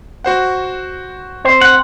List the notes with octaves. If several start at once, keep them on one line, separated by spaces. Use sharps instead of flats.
F#4 C5 F#5
C4 C5
F#5